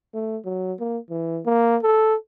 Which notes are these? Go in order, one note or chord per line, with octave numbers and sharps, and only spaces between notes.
A3
F#3
A#3
E3
A#3
A4